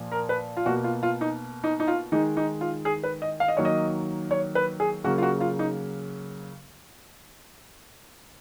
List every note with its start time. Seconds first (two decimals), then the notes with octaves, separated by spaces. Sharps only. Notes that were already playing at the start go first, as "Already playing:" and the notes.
Already playing: A#2 F3
0.12 A#4
0.29 B4
0.57 F4
0.66 B2 A#3 F#4
0.84 F4
1.03 F4
1.21 D#4
1.64 D#4
1.80 D#4
1.88 F4
2.12 D#3 G#3 D#4
2.37 D#4
2.61 F4
2.85 G#4
3.04 B4
3.22 D#5
3.40 F5
3.48 D#5
3.57 D#3 F#3 A#3 C#5
3.65 D#5
4.31 C#5
4.55 B4
4.80 G#4
5.04 C#3 F#3 A#3 F#4
5.18 F4
5.23 F#4
5.41 F4
5.59 D#4